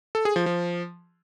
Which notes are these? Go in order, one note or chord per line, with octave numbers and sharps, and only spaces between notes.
A4
G#4
F3
F3